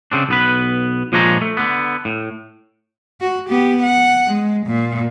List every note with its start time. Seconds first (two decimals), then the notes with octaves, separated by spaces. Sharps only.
0.12 C#3 C4 D4
0.29 B1 B3 B4
1.12 A#2 F3 G#3 D4 C#5 A#5
1.41 A3
1.57 D3 B3
2.05 A2
3.21 F#4
3.49 B3 G4
3.83 F#5
4.27 G#3
4.66 A#2